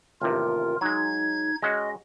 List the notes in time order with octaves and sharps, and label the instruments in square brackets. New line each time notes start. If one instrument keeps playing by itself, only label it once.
[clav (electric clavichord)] A1 D#2 C3 [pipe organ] F4 A#4
[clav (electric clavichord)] F#3 G#3 [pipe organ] D#4 G#6
[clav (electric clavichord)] G#3 C#4 F#4 [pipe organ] D#5